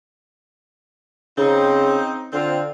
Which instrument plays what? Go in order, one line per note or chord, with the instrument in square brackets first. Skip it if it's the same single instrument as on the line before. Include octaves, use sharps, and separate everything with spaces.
[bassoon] C#3 [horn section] C4 D#4
[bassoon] D3 [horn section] C4 F4